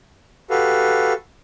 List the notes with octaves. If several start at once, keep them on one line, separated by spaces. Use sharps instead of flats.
F#4 G4 A4 B4 F5